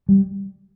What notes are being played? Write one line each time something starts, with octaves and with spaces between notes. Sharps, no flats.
G3